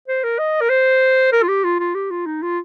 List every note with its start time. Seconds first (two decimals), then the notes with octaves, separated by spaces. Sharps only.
0.08 C5
0.24 A#4
0.39 D#5
0.61 A#4
0.70 C5
1.32 A#4
1.43 F4
1.48 G4
1.64 F4
1.80 F4
1.95 G4
2.11 F4
2.26 D#4
2.43 F4